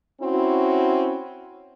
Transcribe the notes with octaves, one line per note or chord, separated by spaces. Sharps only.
C4 C#4 E4 F#4